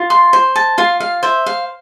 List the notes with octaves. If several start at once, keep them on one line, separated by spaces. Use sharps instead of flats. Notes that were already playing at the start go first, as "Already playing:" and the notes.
Already playing: F4
C6
C5
A5
F4 F5
F5
C5 E5
F5